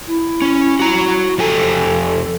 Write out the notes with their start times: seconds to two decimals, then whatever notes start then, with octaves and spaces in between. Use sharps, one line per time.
0.07 E4
0.42 C#4
0.79 F#4 A#5
1.38 F2 G4 A4 G#5